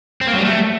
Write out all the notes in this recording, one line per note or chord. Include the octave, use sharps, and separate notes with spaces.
C4
A#3
F#3
G3
A3